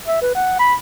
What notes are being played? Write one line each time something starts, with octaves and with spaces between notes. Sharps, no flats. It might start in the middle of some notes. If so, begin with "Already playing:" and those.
E5
B4
F#5
B5